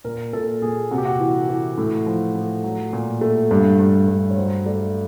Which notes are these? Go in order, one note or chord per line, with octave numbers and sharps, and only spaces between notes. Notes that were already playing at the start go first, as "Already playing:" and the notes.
A#2 A#4
A#2 A4
A#2 G#4
C3 F#4
G4
F#4
E3
E3
A2
F3
A2
F#3
A#2
A3
G2
G2
G2
C#5
F#3 C5
A3 D5